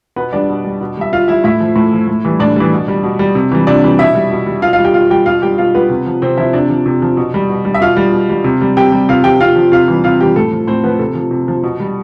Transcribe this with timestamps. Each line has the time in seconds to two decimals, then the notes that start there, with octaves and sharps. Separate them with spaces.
0.16 B2 B3 B4
0.33 G3 D4 D5
0.49 B2
0.65 G3
0.81 B2
0.97 G3 E5
1.12 B2 F4 F5
1.28 G3 E4 E5
1.44 A2 E4 E5
1.60 F3
1.76 A2
1.93 F3
2.08 A2
2.25 E3 G3
2.39 A2 D4 D5
2.56 E3 G3
2.72 B2
2.88 G3
3.04 B2
3.19 G3
3.35 C3
3.52 E3 G3
3.67 C3 D4 D5
3.84 E3 G3
3.99 B2 E4 E5
4.15 G3
4.31 B2
4.46 G3
4.62 B2 F4 F5
4.73 G3 F4 F5
4.84 G4 G5
4.94 B2 F4 F5
5.10 G3 G4 G5
5.26 B2 F4 F5
5.42 G3 G4 G5
5.58 B2 F4 F5
5.74 G3 B3 B4
5.90 C3
6.06 F3
6.22 C3 C4 C5
6.37 F3 E4 E5
6.53 C3 D4 D5
6.69 F3
6.86 C3
7.02 F3
7.17 B2
7.34 G3
7.49 B2
7.65 G3
7.74 E5
7.81 B2 F4 F5
7.97 G3
8.12 B2
8.29 G3
8.44 C3
8.61 G3
8.77 C3 G4 G5
8.92 G3
9.09 C3 F4 F5
9.24 F3 G4 G5
9.40 C3 F4 F5
9.56 F3
9.72 C3 F4 F5
9.88 E3 G3
10.04 C3 F4 F5
10.19 E3 G3 G4
10.36 A2 A4
10.52 F3
10.67 A2 C4 C5
10.84 F3 B3 B4
10.99 C3 A4
11.15 F3
11.31 C3
11.48 F3
11.63 B2
11.80 G3